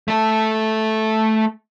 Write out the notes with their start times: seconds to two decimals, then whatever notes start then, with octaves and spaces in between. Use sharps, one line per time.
0.08 A3 A4